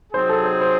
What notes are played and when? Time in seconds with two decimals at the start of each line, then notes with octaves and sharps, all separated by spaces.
0.13 C3 F#3 C4 D#4 G#4 C5
0.29 A4
0.45 C5
0.61 C5